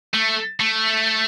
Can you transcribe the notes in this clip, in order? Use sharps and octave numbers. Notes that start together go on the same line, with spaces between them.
A3
A3